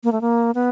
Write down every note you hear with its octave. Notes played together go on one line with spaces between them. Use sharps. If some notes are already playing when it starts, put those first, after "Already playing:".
A#3
A3
A#3
B3